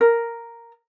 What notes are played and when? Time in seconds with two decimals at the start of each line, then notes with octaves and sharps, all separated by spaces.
0.01 A#4